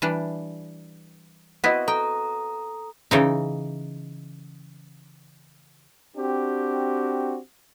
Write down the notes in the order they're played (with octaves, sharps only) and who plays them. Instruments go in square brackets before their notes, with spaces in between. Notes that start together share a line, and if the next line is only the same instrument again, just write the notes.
[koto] E3 G3 D4
[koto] B3 C4 E4 [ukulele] F#4 D#5 F#5
[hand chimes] A4 A#5 D#6 [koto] G5
[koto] C#3 E3 D#4
[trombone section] C4 D4 F#4 G4